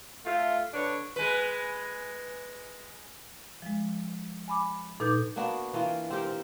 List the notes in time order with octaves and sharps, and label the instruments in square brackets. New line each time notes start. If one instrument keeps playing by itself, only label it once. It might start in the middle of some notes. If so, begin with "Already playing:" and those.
[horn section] A3 F4
D3 D4 B4 C#5
[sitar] G#3 B4
[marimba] F3 G#3
G#5 B5 D6
A#2 D#4 A4 B4 D6 G6
[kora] A#3 B3 D4 F#4
E3 A#3 F4
C4 G4 A#4 G5
C4